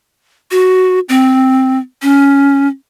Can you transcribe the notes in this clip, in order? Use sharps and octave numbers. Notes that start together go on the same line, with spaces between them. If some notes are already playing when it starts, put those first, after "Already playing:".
F#4
C4
C#4